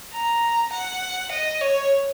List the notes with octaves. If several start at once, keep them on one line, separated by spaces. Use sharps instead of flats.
A#5
F#5
D#5
C#5